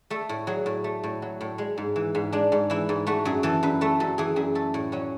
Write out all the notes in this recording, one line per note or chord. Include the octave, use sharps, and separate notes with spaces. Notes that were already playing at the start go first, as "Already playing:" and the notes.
A3 A4
A2
F#3 G#4
A2
A3
A2
F#3
A2
G#3
G#2
E3
G#2
G#3 D4
G#2
E3 E4
G#2
A3 F#4
F#2 G#4
E3 A4
F#2 B4
A3 A4
F#2 A4
E3 G#4
F#2 G#4
A3 A4
A2
F#3 C#4